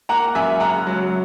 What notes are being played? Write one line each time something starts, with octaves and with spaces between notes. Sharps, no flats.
A#3 F#5 A#5
F#2 E5 G#5
C#3 F#5 A#5
F#3